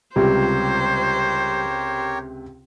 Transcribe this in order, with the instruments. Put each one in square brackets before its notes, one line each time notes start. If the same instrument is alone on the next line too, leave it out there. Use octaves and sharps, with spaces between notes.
[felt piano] C#2 C3 [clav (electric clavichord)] G3 F4 [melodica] G4 A#4 C#5 [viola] C5